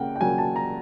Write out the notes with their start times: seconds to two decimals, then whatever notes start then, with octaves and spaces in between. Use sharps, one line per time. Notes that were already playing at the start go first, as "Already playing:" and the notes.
Already playing: C#3 A#3 F#5 G5
0.16 G5
0.21 C#3 F#3 A#3 G#5
0.38 A5
0.56 A#5